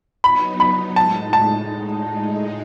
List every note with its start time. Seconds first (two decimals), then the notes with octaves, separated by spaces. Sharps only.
0.24 F#3 B3 D#4 B5
0.60 B5
0.96 A2 G#3 D#4 A5
1.33 A5